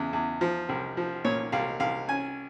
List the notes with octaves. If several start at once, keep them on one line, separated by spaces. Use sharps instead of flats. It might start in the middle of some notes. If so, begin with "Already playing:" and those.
Already playing: E2 C#3
E2
F3
C2
F3
A#2 C#5
C2 F5
C2 F5
C#4 G#5